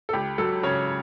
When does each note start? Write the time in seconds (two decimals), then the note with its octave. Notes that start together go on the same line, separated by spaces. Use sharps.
0.09 A4
0.13 C#2 G4
0.38 F#3 A4
0.63 C#3 C#5